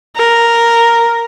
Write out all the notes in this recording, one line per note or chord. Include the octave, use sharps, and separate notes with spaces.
A#4